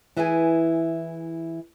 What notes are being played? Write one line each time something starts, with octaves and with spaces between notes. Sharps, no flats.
E3 E4 G#4 B4 D5 G#5